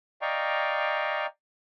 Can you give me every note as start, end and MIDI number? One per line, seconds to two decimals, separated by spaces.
0.22 1.26 74
0.22 1.26 75
0.22 1.26 77
0.22 1.26 79
0.22 1.26 82
0.22 1.26 85